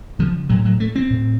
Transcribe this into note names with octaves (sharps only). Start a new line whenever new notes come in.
C#3 F3
A2 F#3
F#3
A3
C4
A2